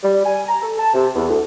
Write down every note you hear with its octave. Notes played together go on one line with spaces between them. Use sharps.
G3
G#5
A#5
A4
A5
C3
E2
D2